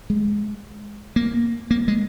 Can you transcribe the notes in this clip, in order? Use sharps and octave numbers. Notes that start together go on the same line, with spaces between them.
G#3
A#3
A#3
G#3